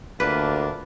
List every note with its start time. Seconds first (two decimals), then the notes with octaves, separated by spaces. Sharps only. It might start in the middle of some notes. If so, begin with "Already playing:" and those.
0.20 D2 A#3 D4 F4 B4